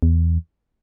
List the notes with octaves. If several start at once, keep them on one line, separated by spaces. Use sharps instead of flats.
E2